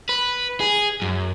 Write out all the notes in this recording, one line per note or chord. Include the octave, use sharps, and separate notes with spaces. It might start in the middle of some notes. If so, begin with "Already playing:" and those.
B4
G#4
F#2